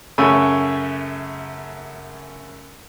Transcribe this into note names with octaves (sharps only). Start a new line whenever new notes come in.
F#2 C#3 A3 C#5 G#5 E6